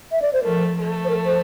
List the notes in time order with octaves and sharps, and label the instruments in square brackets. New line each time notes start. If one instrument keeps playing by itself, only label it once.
[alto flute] E5
D5
C5
[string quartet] F3 A3 [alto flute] A#4
[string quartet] F3 A3
[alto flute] C5
A#4
C5